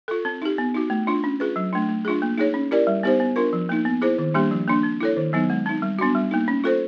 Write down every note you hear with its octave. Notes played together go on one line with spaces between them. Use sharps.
F4 A4
C4
D#4 G4
B3
D#4 F#4
A3
D4 F4
C#4
F4 G#4 B4
F#3
A3 D4
A3
D4 F4 G#4
A#3
D#4 G#4 C#5
C#4
E4 G4 A#4 D5
G3
B3 D#4 G4 C5
B3
D4 F4 A#4
F3
A#3 D#4
B3
E4 G#4 C5
D#3
G3 A#3 D4 G4
F3
A#3 D4
C4
E4 A4 C#5
D#3
F#3 B3 D#4
G#3
C4 D#4
G3
B3 D4 F#4
G3
A#3 D#4
C#4
F4 A4 C5